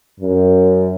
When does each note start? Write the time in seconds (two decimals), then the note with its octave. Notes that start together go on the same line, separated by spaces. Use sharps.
0.20 F#2